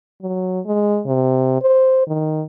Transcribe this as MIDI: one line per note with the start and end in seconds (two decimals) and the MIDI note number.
0.22 0.60 54
0.66 1.01 56
1.06 1.59 48
1.61 2.03 72
2.08 2.43 51